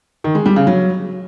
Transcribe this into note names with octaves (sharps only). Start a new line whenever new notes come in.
D#3
G#3
G3
C#3
F#3